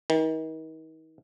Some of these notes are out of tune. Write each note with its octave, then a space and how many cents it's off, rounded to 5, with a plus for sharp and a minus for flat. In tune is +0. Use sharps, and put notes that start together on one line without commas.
D#3 +40